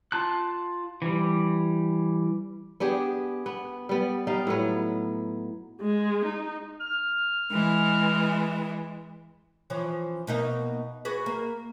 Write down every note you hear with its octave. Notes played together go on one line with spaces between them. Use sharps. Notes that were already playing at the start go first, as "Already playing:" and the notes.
F4 A5 F#6
E3 G3
B3 D4 G4 G#4
B3
G3 B3
G3 D#4 F5
A2 F#3 B3
G#3
D#4
F6
E3 G#3
E3 F3 C#4
B2 A#3 D#4
F#4 G#4 B4
A#3